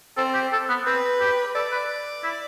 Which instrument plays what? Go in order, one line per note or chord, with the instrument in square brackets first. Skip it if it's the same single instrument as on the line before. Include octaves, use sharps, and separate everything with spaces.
[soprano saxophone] C4 [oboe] A4
[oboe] G4
A4
B3
[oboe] C4 [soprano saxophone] B4
[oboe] G4
[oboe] A4 [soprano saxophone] D5
[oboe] B4
E4